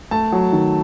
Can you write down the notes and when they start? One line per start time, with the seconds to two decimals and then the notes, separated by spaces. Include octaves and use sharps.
0.11 A3 A5
0.32 F#3
0.53 D#3